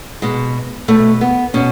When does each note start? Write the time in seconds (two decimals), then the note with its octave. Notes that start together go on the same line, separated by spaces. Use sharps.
0.22 B2 G#3
0.88 B2 A3
1.21 B3
1.54 B2 C#4